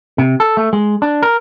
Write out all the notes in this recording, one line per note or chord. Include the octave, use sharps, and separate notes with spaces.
C3
A4
A3
G#3
D4
A#4